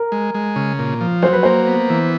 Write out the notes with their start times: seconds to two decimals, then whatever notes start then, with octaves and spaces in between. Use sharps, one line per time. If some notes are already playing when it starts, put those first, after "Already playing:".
Already playing: A#4
0.12 G#3
0.34 G#3
0.56 C#3
0.79 A#2
1.01 F3
1.22 F#3 C5
1.33 B4
1.43 A#3 C5
1.67 B3
1.90 E3